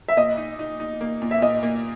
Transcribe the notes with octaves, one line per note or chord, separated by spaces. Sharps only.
E5
A#2 D#5
D#4
D#4
D#4
A#3
A#2
E5
A#2 D#5
A#3